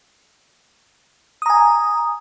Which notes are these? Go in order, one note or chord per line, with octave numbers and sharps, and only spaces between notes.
G#5 A#5 D#6